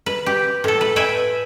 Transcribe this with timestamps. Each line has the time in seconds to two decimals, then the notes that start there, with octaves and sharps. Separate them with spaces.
0.06 B4
0.26 G4
0.64 A2 A4
0.81 B4
0.96 B4 E5 G5 G#5